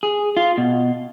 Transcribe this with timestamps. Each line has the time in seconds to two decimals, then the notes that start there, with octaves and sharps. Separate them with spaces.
0.03 G#4
0.37 F4
0.58 B2